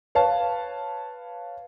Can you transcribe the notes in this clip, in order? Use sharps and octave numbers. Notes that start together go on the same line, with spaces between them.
B4 C#5 F5 A5